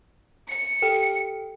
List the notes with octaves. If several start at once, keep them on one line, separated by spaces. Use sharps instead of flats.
C#7
G4 A4 G5